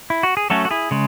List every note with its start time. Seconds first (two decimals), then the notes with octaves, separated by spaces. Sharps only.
0.10 E4
0.23 F#4
0.37 G#4
0.50 F#3 A3 C#4 F#4 A4
0.65 F#4
0.71 E4 G#4
0.91 C#3 G#3